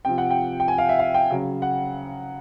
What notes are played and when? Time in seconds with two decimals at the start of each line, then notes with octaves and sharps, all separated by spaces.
0.05 C3 F3 G5
0.18 F#5
0.30 G5
0.60 G5
0.68 G#5
0.78 F5
0.89 E5
0.99 F5
1.14 G5
1.30 C#3 F#3
1.62 F#5